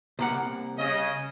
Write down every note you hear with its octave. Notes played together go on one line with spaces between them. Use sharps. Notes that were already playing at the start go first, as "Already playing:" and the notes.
C2 A#3 F#5
C#3 D#5